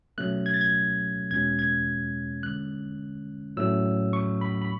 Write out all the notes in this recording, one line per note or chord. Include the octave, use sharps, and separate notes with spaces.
B2 F#3 A3 C#4 F#6
G#6
A6
G#6
E2 B2 G#3 C#4 G#6
G#6
D3 G#3 C#4 F#6
A2 F#3 A3 C#4 E6
C#6
B5
B5